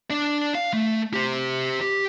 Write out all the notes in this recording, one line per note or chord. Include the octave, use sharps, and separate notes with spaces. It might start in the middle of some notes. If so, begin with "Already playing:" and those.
D4 D5
F5
A3
G4 C5
G4